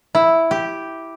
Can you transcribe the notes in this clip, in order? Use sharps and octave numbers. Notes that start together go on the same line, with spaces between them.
E4
G4